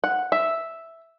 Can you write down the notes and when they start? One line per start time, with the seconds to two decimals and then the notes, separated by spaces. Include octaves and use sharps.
0.04 F#5
0.32 E5